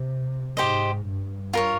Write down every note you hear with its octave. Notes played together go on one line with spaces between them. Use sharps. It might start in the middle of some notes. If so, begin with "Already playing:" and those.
Already playing: C3
G#2 G4 C5 D#5
G2
F4 A#4 C#5